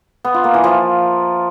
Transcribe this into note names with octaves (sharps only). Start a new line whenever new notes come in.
B3
F4
A#3
E3
F3